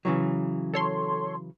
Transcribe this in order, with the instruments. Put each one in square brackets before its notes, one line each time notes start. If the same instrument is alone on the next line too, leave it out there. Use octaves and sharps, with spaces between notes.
[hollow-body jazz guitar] C#3 E3 F#3
[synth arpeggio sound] A4 C#5 C6